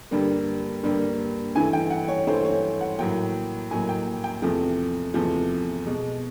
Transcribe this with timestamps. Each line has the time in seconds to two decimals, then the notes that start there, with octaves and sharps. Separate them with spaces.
0.11 G2 D3 G3 A#3
0.83 G2 D3 G3 A#3
1.55 G2 E3 A3 G#5
1.73 G5
1.90 F#5
2.08 C#5
2.27 G2 E3 A3 C5
2.45 C#5
2.81 F#5
2.99 A2 F#3 A#3 G5
3.71 A2 F#3 A#3 G#5
3.89 G5
4.24 G5
4.42 E2 C3 F3 A3
5.14 E2 C3 F3 A3
5.86 B2 G#3